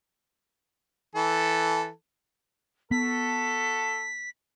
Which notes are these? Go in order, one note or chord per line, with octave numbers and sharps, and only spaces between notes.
E3 A4
B3 F#4 A4 B6